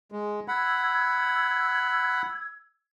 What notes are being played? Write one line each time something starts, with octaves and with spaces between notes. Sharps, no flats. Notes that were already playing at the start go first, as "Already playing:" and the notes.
G#3
F#5 B5 E6 G#6